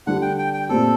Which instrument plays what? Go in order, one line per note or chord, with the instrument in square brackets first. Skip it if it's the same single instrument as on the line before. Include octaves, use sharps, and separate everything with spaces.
[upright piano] D3 G3 D4 G4 [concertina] F#5
[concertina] G5
G5
G5
[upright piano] A#2 A3 C4 G4 [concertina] A4